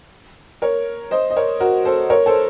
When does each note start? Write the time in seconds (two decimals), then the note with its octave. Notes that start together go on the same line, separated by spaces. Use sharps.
0.62 A#4 C#5
1.11 C5 D#5
1.30 D#5
1.36 A#4 C#5
1.60 F#4 A#4
1.85 A4 C5
2.10 A#4 C#5
2.26 A4 C5